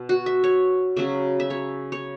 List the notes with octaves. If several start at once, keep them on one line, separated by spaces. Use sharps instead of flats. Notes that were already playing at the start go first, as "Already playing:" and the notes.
Already playing: B2
F#4
E5
C#5
C#3 F#3 C#4 E5
E5
C#5
C#5